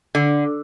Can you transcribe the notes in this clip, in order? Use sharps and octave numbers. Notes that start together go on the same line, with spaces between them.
D3